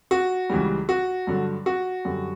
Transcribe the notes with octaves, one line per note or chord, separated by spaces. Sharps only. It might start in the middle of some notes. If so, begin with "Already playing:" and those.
F#4
C#2 C#3 E3 G3
F#4
G2 D3 F#3
F#4
F#2 D3 G3